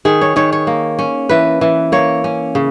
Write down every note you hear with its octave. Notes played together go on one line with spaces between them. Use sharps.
D#3 G#4
C#5
D#3 C#5
C#5
A#3
C#4
E3 B4
E3
A#3 C#5
C#4
C#3